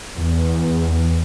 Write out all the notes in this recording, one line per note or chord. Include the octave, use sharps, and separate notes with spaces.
E2